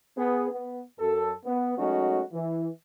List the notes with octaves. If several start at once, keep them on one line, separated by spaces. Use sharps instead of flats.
B3 G#4
B3
F#2 A4
B3
F#3 G#3 A3 C#4 D#4 F#4
E3